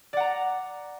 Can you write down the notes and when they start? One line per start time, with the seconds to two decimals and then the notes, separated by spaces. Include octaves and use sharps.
0.13 D5
0.17 F#5
0.20 A#5